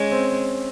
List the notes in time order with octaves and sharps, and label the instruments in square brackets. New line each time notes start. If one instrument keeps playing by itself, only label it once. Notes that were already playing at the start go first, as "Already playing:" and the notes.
Already playing: [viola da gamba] G#3 [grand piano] C#4
[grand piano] C4